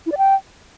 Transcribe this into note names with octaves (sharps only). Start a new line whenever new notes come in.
E4
D5
G5